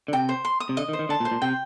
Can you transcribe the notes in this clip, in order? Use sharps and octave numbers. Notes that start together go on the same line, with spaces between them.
D3
C3 G5
C5
C6
D#6
C3
D3 D#5
D#3
C5
D#3
D3 A5
A#2
C5
A#2
C3 G5